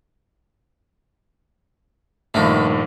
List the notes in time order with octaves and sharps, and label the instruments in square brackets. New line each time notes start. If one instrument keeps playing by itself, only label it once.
[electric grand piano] A#1 G2 D#3 [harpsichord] A3 B3 F4